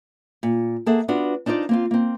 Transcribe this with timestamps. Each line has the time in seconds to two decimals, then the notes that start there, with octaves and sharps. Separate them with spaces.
0.43 A#2
0.86 A#3 G#4 A4 E5 F#5
1.08 B3 D4 F4 F#4
1.46 D4 D#4 F4 C5 D5
1.69 A#3 C4 F4
1.91 A#3 C4